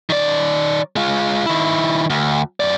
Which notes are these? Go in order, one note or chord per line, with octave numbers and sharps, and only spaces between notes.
D#3 D5
G#3 F4
D#3 E4
D2
F#2 D5